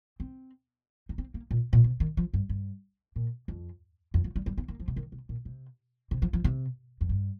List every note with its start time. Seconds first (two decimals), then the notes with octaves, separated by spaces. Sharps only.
0.20 C4
1.09 D#4
1.18 C4
1.34 A#3
1.51 A#2
1.73 A#2
1.84 C3
2.00 D#3
2.17 F3
2.34 G2
2.49 G2
3.16 A#2
3.48 F2
4.14 F2
4.24 F3
4.36 G3
4.46 G3
4.58 C4
4.68 A#3
4.80 F3
4.88 C3
4.96 D#3
5.12 C3
5.29 A#2
5.45 C3
6.11 C3
6.22 F3
6.33 F3
6.44 C3
7.01 F2
7.09 G2